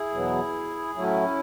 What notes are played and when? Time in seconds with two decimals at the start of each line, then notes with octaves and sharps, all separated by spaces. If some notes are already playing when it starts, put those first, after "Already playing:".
Already playing: E4 G#4
0.10 E2 B2 F#3 B3
0.95 A2 F#3 A3 C#4 E4